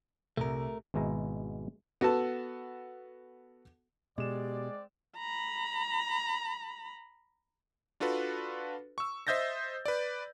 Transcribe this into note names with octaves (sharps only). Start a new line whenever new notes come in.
C2 A3 A#4
G#1 B2 G#3 E4 A#5
B3 F#4 A4 A5
B2 G#3 C4 G4 D5 E7
A#5 B5
D4 F4 F#4 A4 B4
C#6 E6
C5 D#5 E5 G6 A6 A#6
B4 D5